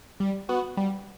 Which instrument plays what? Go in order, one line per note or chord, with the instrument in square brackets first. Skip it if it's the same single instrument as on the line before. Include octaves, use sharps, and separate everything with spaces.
[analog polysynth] G3
B3 F#4
G3